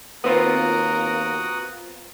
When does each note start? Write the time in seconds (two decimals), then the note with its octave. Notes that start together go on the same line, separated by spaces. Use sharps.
0.24 D#2 B3 C4 F4 F#4 A#4 D#6